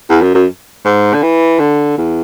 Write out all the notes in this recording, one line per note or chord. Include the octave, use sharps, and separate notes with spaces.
E2
F#2
F#2
G#2
D3
E3
D3
E2